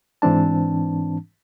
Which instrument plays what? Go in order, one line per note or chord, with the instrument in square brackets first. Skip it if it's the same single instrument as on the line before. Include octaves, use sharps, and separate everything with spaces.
[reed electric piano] G#2 E3 C4 D4 A5